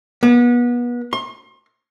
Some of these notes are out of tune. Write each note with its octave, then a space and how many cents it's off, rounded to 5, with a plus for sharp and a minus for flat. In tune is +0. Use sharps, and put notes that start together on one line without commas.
B3 -30
C6 +35